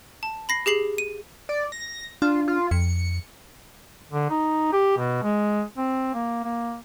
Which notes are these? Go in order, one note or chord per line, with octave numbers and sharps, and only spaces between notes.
A5
B5 A#6 C7
G4 G#4 C7 F#7
D#7
D5
A#6
D4 F4
F4
F2 C#7
D3
D#4
G4
B2
G#3
C4
A#3
A#3